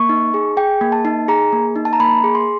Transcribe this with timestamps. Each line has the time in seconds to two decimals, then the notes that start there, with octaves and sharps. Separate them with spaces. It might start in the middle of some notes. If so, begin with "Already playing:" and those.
Already playing: A#3 C#6
0.09 D#4
0.34 G#4
0.57 G#4 G5
0.81 A#3
0.92 A5
1.05 D#4
1.28 G#4 A#5
1.53 A#3
1.76 D#4
1.85 A5
1.93 A#5
2.00 A#3 B5
2.24 G#4
2.35 C6